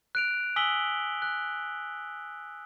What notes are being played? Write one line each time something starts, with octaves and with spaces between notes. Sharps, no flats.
F#6 D7 F7
G#5 D#6 E6 B6 F#7 G7
F#6